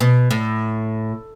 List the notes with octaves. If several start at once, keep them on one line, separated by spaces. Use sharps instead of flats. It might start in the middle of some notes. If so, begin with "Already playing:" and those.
B2
A2